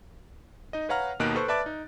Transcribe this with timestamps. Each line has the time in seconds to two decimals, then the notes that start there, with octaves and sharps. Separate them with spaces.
0.73 D#4 D#5
0.89 B4 C#5 F5 F#5 A#5 F6
1.20 D#2 B2 A#3 D#4 F#6 D7
1.35 A4 B4 C5 C#6
1.48 B4 D5 E5 A5 D6 A6
1.66 D#4